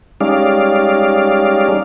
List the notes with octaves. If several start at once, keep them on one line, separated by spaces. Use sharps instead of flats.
G3 G#3 C#4 D#4 D5 F5